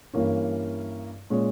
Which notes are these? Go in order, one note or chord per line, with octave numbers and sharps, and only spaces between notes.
G2 E3 A#3 C#4
A#2 G#3 C#4